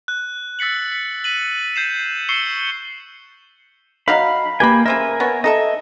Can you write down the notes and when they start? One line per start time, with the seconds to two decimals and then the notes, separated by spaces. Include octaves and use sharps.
0.08 F#6
0.59 E6 A6 B6 C#7 F#7
0.92 B6
1.24 B6 D#7 F#7
1.76 G6 C7 E7
2.29 C#6 E6 C7 C#7 E7 G7
4.08 F#3 D#4 F5 B5
4.60 A#3 G4 B4 G#5 B5
4.85 C#3 A#4 C5 E5 G#5
5.20 B3 C#5
5.44 D#4 A4 D#5 E5